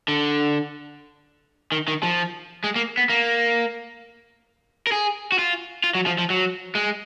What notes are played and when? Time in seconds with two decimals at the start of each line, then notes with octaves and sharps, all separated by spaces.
0.08 D3
1.72 D#3
1.88 D#3
2.03 F3
2.64 G#3
2.76 A#3
2.97 B3
3.09 A#3
4.87 A#4
4.92 G#4
5.32 F#4
5.39 F4
5.84 F4
5.95 F#3
6.06 F3
6.18 F3
6.30 F#3
6.75 G#3